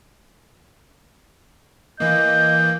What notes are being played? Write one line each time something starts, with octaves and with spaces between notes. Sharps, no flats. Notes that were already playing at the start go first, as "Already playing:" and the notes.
E3 A#3 D#5 G6